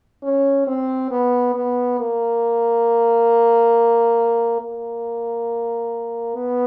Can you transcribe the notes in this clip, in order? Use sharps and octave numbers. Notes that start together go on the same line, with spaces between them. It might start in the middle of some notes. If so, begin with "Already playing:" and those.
C#4
C4
B3
B3
A#3
A#3
B3